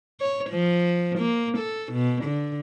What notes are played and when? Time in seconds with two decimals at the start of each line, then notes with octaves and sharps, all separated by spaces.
0.20 C#5
0.50 F3
1.18 A#3
1.58 A4
1.92 B2
2.24 D3